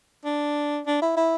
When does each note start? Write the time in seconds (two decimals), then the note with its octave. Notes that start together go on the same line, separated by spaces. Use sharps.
0.25 D4
0.86 D4
1.02 E4
1.16 E4